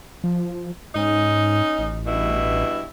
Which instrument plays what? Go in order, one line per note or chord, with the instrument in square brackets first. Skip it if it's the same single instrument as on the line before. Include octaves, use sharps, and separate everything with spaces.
[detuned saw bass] F3
[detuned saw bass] G#2 [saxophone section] C#4 D#4
[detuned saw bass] A1
[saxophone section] G2 B2 E4